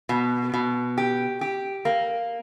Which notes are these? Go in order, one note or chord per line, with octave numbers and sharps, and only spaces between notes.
B2
B2
G4
G4
A#3